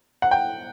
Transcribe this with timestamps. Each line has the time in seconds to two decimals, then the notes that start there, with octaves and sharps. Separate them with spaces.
0.22 F#5
0.31 G5